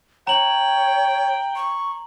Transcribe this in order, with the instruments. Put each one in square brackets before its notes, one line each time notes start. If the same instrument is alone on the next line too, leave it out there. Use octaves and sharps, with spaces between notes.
[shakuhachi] C#5 [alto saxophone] G5 [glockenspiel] A#5 F#7
[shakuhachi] C#6